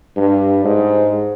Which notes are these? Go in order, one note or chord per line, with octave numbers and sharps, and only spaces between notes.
G2
G#2